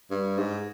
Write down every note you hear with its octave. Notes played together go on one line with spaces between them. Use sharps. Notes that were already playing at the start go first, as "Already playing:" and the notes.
G2
G#2